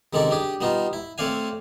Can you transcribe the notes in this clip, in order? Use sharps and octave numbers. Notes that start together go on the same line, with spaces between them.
C3 D#3 G#3 C#4 A4 D5
D4 G4 G#4
G3 B3 D#4 F4
E4
A3 C4 C#5 D5 F5 G#5